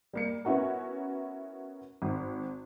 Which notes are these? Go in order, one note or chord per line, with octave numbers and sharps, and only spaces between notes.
G3 A#3 C#7
B3 C#4 E4 F#4 A#4
G#1